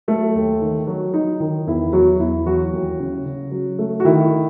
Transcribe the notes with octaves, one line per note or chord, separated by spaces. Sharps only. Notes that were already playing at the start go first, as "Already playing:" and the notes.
F#3 A3 A4
D#2
D#3
F#3 F#4
F#3 D#4
D#3 D#4
E2 E4
E2 F#3 F#4
E2 E4
E3 F#3 F#4
D#2
C#3
C#3
F#3
A3
F#4
D#3 E4